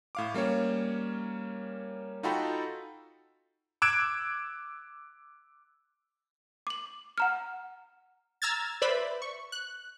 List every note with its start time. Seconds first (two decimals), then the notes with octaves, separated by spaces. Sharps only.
0.15 A2 F5 D6
0.34 G3 A#3 C#4 C#5
2.23 D#4 F4 F#4 A4 G5 B5
3.82 D6 E6 F#6 G#6 D7 E7
6.67 D6 F#7
7.18 F#5 A#5 F6
8.42 A#5 E6 F6 G#6 A6
8.82 B4 C5 D5 E5 B5
9.22 C#6
9.52 F#6